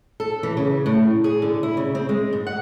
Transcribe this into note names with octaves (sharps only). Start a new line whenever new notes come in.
A4
E3
C#3
A2
G#4
D3
E4
C#3
C4
G#3
G#2
F#5